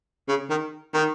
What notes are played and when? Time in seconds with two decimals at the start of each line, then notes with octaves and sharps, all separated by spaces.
0.28 C#3
0.50 D#3
0.94 D#3